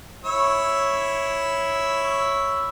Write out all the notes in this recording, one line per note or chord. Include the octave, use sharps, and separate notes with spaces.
E4 C#5 E6